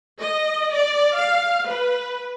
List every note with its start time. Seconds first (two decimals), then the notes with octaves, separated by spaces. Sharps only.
0.21 D#5
0.74 D5
1.17 F5
1.69 B4